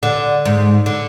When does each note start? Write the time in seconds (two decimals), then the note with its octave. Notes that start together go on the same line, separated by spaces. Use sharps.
0.03 D3
0.45 G#2
0.86 D3